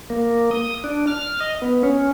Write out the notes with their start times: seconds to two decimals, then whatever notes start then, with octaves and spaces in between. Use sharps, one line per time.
0.10 A#3
0.51 D#6
0.84 D4
1.07 F6
1.41 D#5
1.62 B3
1.83 C#4